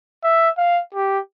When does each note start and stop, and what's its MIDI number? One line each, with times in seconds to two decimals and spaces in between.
0.24 0.50 76
0.58 0.81 77
0.94 1.19 67